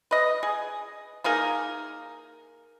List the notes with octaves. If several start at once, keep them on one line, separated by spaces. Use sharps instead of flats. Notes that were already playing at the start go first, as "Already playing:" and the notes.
B4 D#5
G#4
A#3 D#4 G#4 A#4